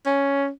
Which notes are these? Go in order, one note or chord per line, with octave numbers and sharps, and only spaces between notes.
C#4